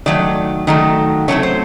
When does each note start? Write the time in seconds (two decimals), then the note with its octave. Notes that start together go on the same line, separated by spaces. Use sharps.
0.06 D#3 F#3 A3 D5
0.67 D#3 F#3 A3
1.28 D3 F#3 A3 C4 C#5
1.43 C5